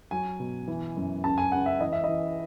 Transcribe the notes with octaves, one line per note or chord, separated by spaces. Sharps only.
F#3 G#5
B2
E3
F#2
C#2 A5
G#5
C#2 F#5
E5
E3 D#5
E5
E3 D#5